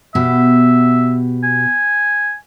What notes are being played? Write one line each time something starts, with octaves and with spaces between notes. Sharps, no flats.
B2 G4 E5
G#5